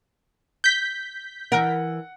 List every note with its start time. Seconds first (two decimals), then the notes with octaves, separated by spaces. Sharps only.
0.64 G6 B6
1.52 E3 A#4 F#5